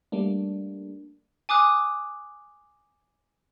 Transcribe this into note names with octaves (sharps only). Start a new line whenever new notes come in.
G3 A3 A#3 D4
G#5 D6 D#6 F#6